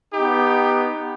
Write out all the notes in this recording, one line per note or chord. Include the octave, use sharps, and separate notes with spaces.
B3 D#4 G4